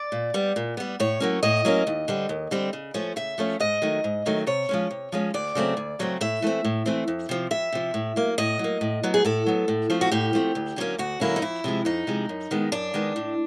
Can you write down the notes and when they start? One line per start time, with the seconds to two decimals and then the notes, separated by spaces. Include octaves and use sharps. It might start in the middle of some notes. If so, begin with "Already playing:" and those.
Already playing: D5
0.12 A#2
0.34 G3 B3
0.56 A#2
0.77 G3 B3
1.00 A2 C#5
1.20 F#3 A#3 C#4
1.43 A2 D#5
1.65 F#3 A#3 C#4
1.87 D#2
2.08 D3 G3 C4
2.29 D#2
2.51 D3 G3 C4
2.73 C#3
2.94 F3 A3 C#4
3.16 C#3 E5
3.38 F3 A3 C#4
3.60 G#2 D#5
3.82 D#3 F#3 A3
4.04 G#2
4.26 D#3 F#3 A3
4.47 C3 C#5
4.69 F3 G#3 C#4
4.91 C3
5.12 F3 G#3 C#4
5.34 D2 D5
5.55 C#3 F#3 A3 C4
5.77 D2
5.99 C#3 F#3 A3 C4
6.21 A2 E5
6.42 E3 A3 C4
6.64 A2
6.86 E3 A3 C4
7.08 F2
7.29 C3 F3
7.51 F2 E5
7.72 C3 F3
7.94 A2
8.16 F#3 A#3
8.38 A2 D#5
8.59 F#3 A#3
8.81 A2
9.03 F#3 B3
9.14 G#4
9.25 A2 A4
9.46 F#3 B3
9.68 A2
9.90 F3 A3 C4
10.01 F#4
10.12 A2 G4
10.33 F3 A3 C4
10.55 D2
10.76 D3 F#3 A#3 C#4
10.98 D2 F#4
11.20 D3 F#3 A#3 C#4 E4
11.36 D#4
11.42 F2 E4
11.64 C3 F3 G#3
11.85 F2 D#4
12.07 C3 F3 G#3
12.29 F#2
12.51 D#3 G#3 B3
12.72 F#2 D4
12.94 D#3 G#3 B3
13.16 A2